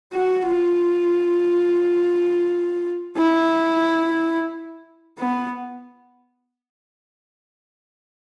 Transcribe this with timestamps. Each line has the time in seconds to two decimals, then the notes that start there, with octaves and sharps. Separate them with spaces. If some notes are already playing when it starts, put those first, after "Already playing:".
0.13 F#4
0.47 F4
3.16 E4
5.18 B3